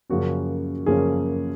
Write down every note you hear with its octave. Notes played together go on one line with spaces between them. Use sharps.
F#2 C#3 F3 A#3 C#4 F#4
F#2 C#3 F3 A#3 C#4 G#4